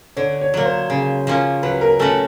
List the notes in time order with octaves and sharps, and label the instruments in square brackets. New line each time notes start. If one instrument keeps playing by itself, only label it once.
[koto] D3 [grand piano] C#5
[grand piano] C#5
[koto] F#3 A#3
[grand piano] C5
[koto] C#3
F3 A#3 C#4
[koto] F#3 [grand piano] B4
[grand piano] A#4
[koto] A3 C#4 F#4 B4 [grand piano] A4